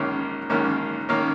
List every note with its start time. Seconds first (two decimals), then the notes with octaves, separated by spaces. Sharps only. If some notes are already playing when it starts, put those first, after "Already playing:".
Already playing: A#1 G#2 D#3 A#3 C#4
0.50 A#1 G#2 D#3 A#3 C#4
1.09 D#3 A#3 C#4